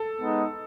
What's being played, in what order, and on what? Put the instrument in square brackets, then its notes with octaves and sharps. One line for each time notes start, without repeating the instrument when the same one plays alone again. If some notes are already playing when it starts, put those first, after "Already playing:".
Already playing: [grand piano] A4
[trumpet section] G#3 B3 D#4